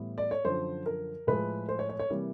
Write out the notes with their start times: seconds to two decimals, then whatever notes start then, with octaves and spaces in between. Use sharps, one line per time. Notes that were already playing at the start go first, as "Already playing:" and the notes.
Already playing: A2 E3 G3 B3 E4
0.18 D5
0.31 C#5
0.45 F#2 D3 F3 C5
0.86 A#4
1.27 A2 F3 G#3 B4
1.69 C5
1.79 C#5
1.89 C#5
1.99 C#5
2.10 C3 E3 G3 A#3